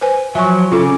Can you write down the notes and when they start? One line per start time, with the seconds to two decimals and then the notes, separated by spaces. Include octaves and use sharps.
0.01 B4 C5 G#5
0.35 F3 F#3 E5 G#5 C#6
0.72 C#3 C#4 F4 A4 D6